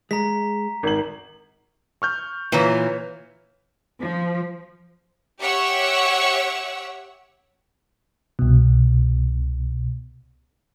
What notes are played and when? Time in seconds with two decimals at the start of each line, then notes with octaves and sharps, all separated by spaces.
0.11 G#3 A#5 B6
0.83 G#1 F#7
2.02 C#6 F6 G6
2.52 A#2 E3 B4 C#5
4.01 F3
5.40 G4 C#5 E5 F#5 C#6 E6
8.39 C2 B2